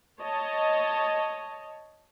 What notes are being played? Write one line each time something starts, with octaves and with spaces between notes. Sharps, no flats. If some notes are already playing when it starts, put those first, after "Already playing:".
C#5 D#5 A5